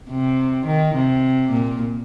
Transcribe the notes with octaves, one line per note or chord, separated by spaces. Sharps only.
C3
D#3
C3
A#2